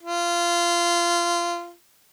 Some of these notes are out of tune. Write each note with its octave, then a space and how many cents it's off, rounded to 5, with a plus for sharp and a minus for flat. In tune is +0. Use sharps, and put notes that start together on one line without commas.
F4 -20